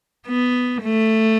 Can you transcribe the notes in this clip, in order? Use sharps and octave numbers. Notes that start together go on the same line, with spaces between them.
B3
A3